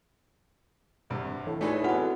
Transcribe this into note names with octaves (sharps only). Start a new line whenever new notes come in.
G#1 G2 C3
A2 E3
A3 D#4 F4 G#4 B4 D5
E3 B3 C4 F#4 F#5